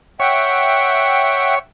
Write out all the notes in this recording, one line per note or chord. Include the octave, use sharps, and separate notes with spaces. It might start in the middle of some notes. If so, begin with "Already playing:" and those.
C#5 E5 F#5 G5